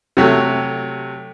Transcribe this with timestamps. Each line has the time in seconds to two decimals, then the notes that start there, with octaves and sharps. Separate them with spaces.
0.17 C3 F#3 A3